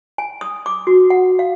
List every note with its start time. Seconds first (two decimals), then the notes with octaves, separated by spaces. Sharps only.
0.18 G#5
0.41 D#6
0.66 D6
0.87 F#4
1.10 F#5
1.39 F5